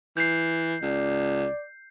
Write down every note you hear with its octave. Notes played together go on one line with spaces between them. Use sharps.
E3 G6 C7
C#2 D5